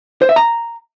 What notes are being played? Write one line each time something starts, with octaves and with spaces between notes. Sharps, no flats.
C5
E5
A#5